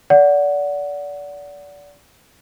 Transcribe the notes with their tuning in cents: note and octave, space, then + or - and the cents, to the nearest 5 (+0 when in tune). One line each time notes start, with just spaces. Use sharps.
D5 -30 F#5 +0